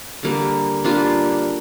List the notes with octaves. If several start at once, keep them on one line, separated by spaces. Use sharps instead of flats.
D3 G3 A#3
G3 A#3 D4 F4